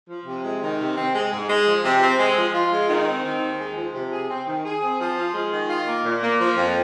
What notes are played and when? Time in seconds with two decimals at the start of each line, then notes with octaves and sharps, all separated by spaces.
0.09 F3
0.26 C3
0.43 G#3
0.62 D#3
0.79 C3
0.96 C4
1.15 G#3
1.31 G#2
1.48 G#3
1.66 F3
1.84 C3
2.01 C4
2.19 G#3
2.37 F3
2.54 F4
2.72 G#3
2.89 D#3
3.06 C4
3.24 D#3
3.42 D#2
3.59 G#3
3.76 F3
3.94 C3
4.12 G#4
4.30 C4
4.47 D#3
4.65 G#4
4.82 C4
4.99 F3
5.17 F4
5.34 G#3
5.52 D#3
5.69 F4
5.86 A#3
6.05 A#2
6.22 A#3
6.40 F3
6.57 F2